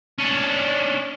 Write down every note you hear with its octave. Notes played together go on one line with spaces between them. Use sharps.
C#4 D4